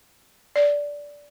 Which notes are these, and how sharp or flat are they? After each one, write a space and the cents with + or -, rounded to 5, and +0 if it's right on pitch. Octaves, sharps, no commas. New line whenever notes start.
D5 -15